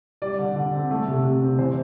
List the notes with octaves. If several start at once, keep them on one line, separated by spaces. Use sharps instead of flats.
G3 D5
D3
D3
C4
A3
C3
C3
C4
E3 C5